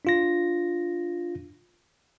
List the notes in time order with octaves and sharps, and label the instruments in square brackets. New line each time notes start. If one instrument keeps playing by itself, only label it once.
[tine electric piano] D4 F4 A#6